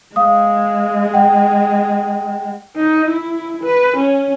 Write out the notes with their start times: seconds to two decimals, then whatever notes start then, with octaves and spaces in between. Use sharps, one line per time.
0.16 G#3 F5 D#6
1.14 F#5 G5
2.77 D#4
3.08 E4
3.64 B4
3.97 C#4